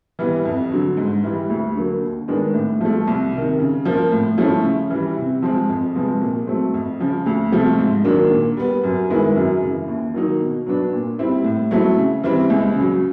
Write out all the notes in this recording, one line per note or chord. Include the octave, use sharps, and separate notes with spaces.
E3 G3 B3
F2
D3 F#3
G#2
E3 G3
D2
D3 F#3 A#3
D#2
D#3 G#3 B3 D4
A2
F3 A3
C2
C3 D#3
C#3
F3 A#3
A2
F3 A3 C#4 E4
C#3
E3 G3
C3
F3 G#3 C4
F2
C3 F3 G#3 B3
A#2
F#3 A3 C4
F2
C#3 F3
D2
C3 F3 A3
G#2
D#3 F#3 A#3 D4
A#2
G3 B3
F#2
D#3 G#3 B3 E4
F#2
C#3 E3
D#2
D#3 F#3 A#3 D#4
B2
F#3 B3 D4
A#2
G3 C4 E4
A2
F#3 A3 C4 E4
C#3
E3 G3 C4
C#2
C#3 F#3